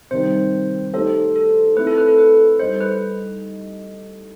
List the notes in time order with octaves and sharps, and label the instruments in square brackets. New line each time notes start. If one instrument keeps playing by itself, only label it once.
[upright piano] C3 D#3 G3 [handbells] C5
[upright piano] A3 D#4 G4 C5 [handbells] A4
[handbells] A4
[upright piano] A3 C4 E4 [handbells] B4
[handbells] A4
B4
A4
B4
[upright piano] G3 D#4 A4 D#5 [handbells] C5
[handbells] B4